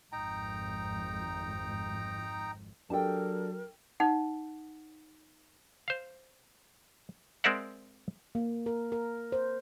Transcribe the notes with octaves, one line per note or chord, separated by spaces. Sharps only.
G#1 F2 D#4 G5 A#5
F#3 D4 G4 A4 A#4 G5 A5
D#4 F#5
C5 F5
G#3 C4 A#4 D5 E5 F#5
A#3
A#4
A#4
C5